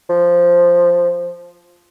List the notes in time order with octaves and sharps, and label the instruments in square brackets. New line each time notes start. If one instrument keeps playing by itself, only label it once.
[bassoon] F3